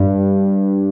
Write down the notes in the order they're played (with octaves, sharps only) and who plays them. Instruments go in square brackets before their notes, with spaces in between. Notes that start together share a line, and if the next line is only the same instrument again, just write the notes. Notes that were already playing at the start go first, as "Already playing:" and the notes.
Already playing: [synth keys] G2